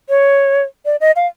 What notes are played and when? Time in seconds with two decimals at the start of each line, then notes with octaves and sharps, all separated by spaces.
0.09 C#5
0.86 D5
1.01 D#5
1.16 F5